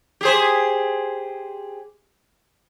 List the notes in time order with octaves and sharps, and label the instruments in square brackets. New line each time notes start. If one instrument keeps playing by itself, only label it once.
[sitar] G4 G#4 C5